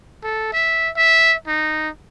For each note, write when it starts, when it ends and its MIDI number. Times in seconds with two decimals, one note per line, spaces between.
0.23 0.48 69
0.53 0.90 76
0.97 1.35 76
1.47 1.89 63